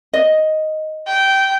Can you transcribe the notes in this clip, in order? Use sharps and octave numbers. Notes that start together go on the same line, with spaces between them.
D#5
G5